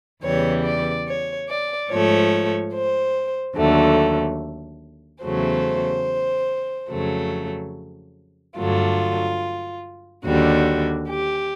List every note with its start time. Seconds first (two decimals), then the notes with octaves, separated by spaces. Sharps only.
0.23 E2 C#3 E3 G3 C#5
0.64 D5
1.06 C#5
1.48 D5
1.90 G#2 F3 A3 C#5
2.73 C5
3.57 D#2 D3 F#3 A3
5.24 E2 C#3 F#3 A3 C5
6.90 F2 C#3 F#3 A3
8.57 G2 D3 F#3 A3 F4
10.24 D#2 D3 G3 F#4
11.08 G4